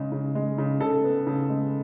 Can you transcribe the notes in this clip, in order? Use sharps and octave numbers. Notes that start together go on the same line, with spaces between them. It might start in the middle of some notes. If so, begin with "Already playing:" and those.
Already playing: C#3 G#3
C#3
G#3
C#3
C#3 A4
B3
C#3
G#3